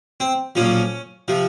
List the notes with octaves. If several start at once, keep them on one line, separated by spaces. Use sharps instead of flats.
C4
B1 A#2 F3 C#4
C3 F3